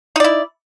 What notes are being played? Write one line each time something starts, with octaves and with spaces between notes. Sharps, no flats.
D#4 E4 D5